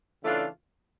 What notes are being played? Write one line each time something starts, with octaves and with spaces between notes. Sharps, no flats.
C#3 E3 A3 D4 F4